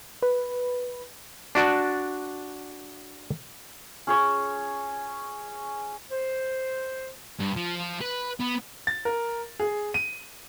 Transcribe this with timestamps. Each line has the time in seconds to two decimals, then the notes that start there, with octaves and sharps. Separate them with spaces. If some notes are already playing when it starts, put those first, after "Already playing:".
0.23 B4
1.55 D4 F#4 D5 A5
4.07 C#4 G#4 C#5
6.11 C5
7.40 G2
7.56 F3
8.01 B4
8.40 B3
8.87 A6
9.05 A#4
9.60 G#4
9.94 D#7